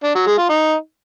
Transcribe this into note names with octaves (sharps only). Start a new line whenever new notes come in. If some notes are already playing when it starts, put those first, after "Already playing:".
D4
F#3
G#3
F4
D#4